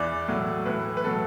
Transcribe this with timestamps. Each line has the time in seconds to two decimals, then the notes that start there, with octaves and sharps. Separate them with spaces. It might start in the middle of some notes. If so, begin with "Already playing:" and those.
Already playing: E2 E3 D5
0.28 A2 F#3
0.66 A2 E3 B4
0.97 B4
1.04 A2 F#3 A4